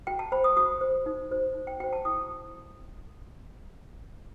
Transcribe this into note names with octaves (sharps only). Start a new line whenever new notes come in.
F#4 G5
A5
C5 B5
D#6
F#4 D#6
C5
D#4
F#4 C5
D#4
G5
F#4 C5 G5
A5
E4 D#6